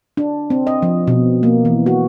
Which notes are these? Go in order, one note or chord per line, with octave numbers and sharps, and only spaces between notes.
D4
C4
D#5
F3
B2
A#3
E3
F#4